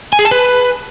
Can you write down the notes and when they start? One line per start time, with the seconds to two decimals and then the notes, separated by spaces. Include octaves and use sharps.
0.13 G#5
0.19 G#4
0.25 A5
0.31 B4